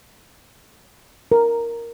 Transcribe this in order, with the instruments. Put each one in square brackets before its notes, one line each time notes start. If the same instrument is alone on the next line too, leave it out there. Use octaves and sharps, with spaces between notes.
[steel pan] A#4